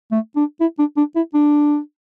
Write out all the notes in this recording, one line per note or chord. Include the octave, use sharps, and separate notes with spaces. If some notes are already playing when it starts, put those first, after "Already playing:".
A3
D4
E4
D4
D4
E4
D4